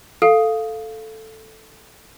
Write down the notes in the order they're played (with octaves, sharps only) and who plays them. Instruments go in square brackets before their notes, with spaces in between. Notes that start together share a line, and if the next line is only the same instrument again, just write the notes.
[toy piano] A4 [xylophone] F5